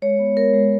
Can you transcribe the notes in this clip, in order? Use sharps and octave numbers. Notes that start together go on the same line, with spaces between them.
G#3 C#5
B3
G#3 A#4
G#3